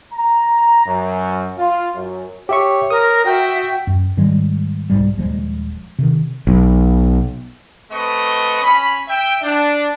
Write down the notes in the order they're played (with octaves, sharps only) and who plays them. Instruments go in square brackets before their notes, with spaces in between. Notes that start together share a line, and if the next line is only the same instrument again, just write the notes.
[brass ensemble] A#5
F#2
F4
F#2
[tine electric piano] G4 E5 C#6 [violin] C#5
[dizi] A#4 [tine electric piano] D#6
[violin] F#4 E5 [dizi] G5
[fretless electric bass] F#2
G#2 D#3 G3 G#3
C2 G#2 G3
D#1 F3 F#3 G#3
C3 D#3
[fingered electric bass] B1
[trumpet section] A3 C4 B4 D#5 C#6
C#4 B5
E5 G5
D4